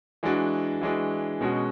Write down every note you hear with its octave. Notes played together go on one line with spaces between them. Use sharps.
E3 G#3 D4 F#4
E3 G#3 D4 F#4
B2 G#3 C#4 F#4